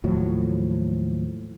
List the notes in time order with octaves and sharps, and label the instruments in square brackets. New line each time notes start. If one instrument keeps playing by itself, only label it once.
[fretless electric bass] D#2 A2 F3 F#3